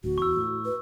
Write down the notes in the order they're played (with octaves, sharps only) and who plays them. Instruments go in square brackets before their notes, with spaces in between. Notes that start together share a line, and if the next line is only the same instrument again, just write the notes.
[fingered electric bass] D1 D2 [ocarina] F#4
[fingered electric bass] E2 [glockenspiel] C#6 E6
[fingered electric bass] A2
[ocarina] B4